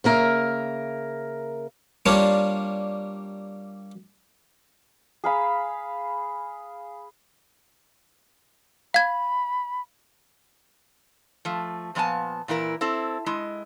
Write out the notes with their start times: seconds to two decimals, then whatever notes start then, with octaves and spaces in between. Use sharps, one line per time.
0.04 C#3 A#3 A#4 E5
2.06 G3 A#3 D4 F4 C#5
5.24 G#4 F5 B5
8.94 F5 B5 G#6
11.45 F3 A3
11.95 A#2 F3 B3 D#5 G#5 A5
12.48 A#2 E3 E4 A#4
12.81 C4 E4 A4
13.26 G#3 E4 D#5